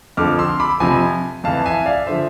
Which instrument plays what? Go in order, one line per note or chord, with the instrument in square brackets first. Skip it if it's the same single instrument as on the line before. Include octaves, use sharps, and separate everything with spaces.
[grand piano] F2 D3 F3 D6 F6
C6 E6
B5 D6
F2 C3 F3 G#5 B5
F2 E3 F5 A5
E5 G#5
D5 F5
D3 F3 C5 E5